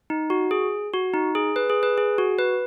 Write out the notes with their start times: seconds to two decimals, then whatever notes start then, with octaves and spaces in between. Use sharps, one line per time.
0.10 D#4
0.30 F#4
0.51 G#4
0.93 F#4
1.14 D#4
1.35 G#4
1.56 B4
1.70 G#4
1.83 B4
1.98 G#4
2.18 F#4
2.39 B4